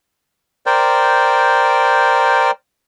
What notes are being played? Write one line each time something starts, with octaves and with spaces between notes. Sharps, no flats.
A#4 C5 D5 G5